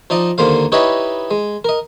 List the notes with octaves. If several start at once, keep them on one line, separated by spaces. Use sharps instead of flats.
F3 D#4 D5 D#5
D#2 D3 A#3 C5 F5
D#4 E4 G4 B4 C#5 D#5
G#3
A#4 D#5